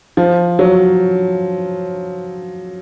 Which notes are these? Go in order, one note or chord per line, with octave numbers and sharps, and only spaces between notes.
F3
F#3